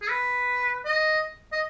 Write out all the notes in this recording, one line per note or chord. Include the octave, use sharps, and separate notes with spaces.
G#4
B4
D#5
D#5